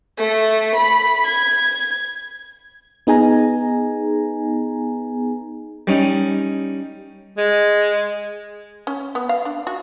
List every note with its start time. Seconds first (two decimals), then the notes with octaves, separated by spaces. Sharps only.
0.18 A3
0.75 B5
1.26 G#6
3.07 B3 D#4 G#4 G#5 A#5
5.87 G3 C#4 D#4
7.38 G#3
8.87 C#4
9.15 B3
9.29 F5
9.45 D4
9.67 F#4